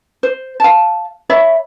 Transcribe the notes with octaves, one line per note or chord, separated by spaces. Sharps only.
C5
F5 A5
C#5 E5 B5